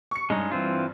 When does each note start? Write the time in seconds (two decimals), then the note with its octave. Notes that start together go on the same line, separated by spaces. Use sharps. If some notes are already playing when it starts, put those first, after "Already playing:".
0.11 C#6 C#7
0.30 G2 G#3 C#4 D#4
0.51 E3 C4 F4